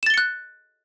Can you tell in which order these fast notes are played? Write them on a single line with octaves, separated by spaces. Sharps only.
E7 A6 G7 C#7 F#6